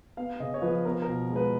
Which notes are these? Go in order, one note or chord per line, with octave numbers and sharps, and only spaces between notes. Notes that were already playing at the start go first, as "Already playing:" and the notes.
B3 F5
C#3 D#5
C#5
F3 B4
B3 A#4
A#4
B2
G#3
B4